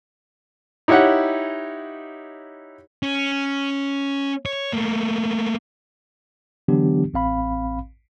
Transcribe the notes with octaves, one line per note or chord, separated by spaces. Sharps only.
D#4 E4 G4 C#5 F#5
C#4
C#5
A3 A#3
D3 E3 F#3 B3 D4 G4
A1 C4 F5 B5